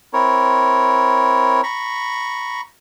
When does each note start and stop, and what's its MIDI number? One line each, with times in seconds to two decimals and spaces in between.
0.13 1.61 60
0.13 1.61 64
0.13 1.61 70
0.13 1.61 73
1.63 2.61 82
1.63 2.61 83
1.63 2.61 85